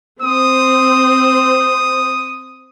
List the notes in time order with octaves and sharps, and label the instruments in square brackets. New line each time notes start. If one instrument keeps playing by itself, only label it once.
[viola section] C4 C5 [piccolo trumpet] D#6